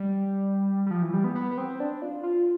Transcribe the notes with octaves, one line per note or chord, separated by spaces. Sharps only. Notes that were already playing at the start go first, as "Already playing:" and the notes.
Already playing: G3
G3
F3
E3
G3
B3
B3
B3
C4
D4
F4
F4